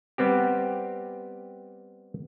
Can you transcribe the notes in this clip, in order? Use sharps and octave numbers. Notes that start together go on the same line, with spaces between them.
G3 B3 C4 G4